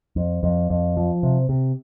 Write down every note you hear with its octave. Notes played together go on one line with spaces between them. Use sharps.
F2
F2
F2
F3
C3
C3